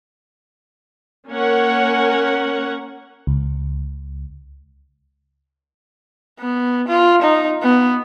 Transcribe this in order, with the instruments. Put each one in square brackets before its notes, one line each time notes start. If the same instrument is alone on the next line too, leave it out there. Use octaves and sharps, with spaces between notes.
[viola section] A#3 C#4 A#4 C#5 F#5
[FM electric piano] C#2
[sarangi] B3
F4
D#4
B3